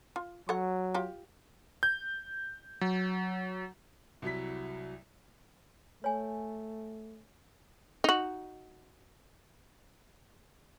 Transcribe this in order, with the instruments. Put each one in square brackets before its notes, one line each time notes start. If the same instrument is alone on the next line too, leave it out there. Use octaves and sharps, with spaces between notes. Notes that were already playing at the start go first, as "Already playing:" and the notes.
[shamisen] F4
[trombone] F#3 [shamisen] A4 C#5 F#5
[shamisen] F4 G4
[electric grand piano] G6
F#3
[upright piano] C2 F#3 E4 B6
[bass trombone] A3 [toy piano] C#5 G#5
[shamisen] D#4 F#4